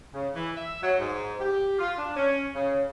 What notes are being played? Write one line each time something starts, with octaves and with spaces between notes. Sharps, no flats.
C#3
E3
E5
F#3
G#2
G4
F4
D4
C#4
C#3